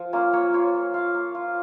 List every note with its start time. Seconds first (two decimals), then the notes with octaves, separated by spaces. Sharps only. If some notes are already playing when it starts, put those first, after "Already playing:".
Already playing: F3
0.13 A#3 C#4 F4
0.33 A#3 C#5
0.53 F4 C#5
0.74 A#3
0.94 F4 F5
1.14 A#3
1.35 F4